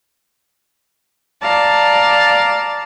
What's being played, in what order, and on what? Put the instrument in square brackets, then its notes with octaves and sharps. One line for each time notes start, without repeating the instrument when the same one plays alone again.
[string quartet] D5 F5 A5 A#5